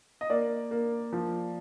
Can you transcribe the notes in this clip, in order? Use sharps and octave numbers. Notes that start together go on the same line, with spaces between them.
D#5
A#3 D5
A#3
F3